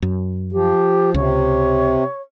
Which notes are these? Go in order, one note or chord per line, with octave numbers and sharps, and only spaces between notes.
F#2
F3 G4
C#2 C3 C#5